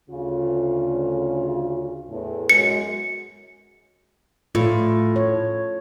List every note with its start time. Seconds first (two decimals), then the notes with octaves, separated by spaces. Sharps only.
0.10 D2 C#3 F4
2.10 E2 A2
2.50 F#2 G#3 C#7
4.55 A2 F4
5.16 C#5